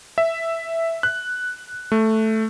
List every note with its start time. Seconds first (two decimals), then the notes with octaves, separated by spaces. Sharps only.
0.18 E5
1.03 F#6
1.92 A3